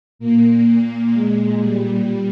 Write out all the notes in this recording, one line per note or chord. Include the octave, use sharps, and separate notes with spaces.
A#2 A#3
A#2
A#2 G#3
A#2 G3